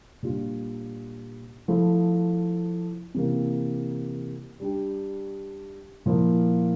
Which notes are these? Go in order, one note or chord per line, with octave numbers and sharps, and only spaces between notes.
A#2 G3 D4 F4
F3 A3 E4
C3 E3 A#3
G3 D4 G4
A#2 F3 A#3 E4